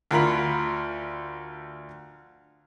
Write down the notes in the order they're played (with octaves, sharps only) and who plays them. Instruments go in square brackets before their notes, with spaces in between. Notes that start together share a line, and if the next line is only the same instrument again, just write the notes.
[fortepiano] D2 F4 A#4 B5